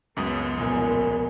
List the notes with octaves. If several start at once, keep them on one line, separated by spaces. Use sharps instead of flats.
C#2 F#2 B3 D#6
E1 A#1 B3 G#5